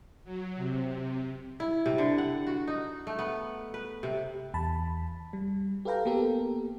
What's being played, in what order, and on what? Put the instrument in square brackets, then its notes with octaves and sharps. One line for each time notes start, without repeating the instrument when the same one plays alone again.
[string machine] F#3
C3
[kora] E4
C3
D3
F#5
F#4
D#4
A3
B3
B4
C3
[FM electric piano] E2 A5 B5
G3
G4 A4 B4 F5 G5 A#5
A#3 B3 G4 A4 A#4